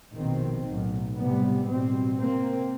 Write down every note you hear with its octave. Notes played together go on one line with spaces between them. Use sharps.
A#1 B2 D#3 C4
B1 A2
A2 C3 G3 B3
A1 B2 G3 C4
C3 A#3 C4